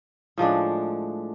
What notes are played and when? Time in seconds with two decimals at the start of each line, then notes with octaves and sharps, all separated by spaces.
0.38 A2 F3 G#3 D4